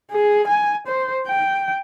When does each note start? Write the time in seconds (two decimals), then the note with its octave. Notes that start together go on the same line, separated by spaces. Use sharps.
0.11 G#4
0.47 G#5
0.87 C5
1.27 G5